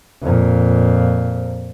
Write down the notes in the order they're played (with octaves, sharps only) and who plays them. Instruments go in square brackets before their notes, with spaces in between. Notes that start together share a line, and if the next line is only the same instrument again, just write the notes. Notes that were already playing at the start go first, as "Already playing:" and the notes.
[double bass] F2 A#2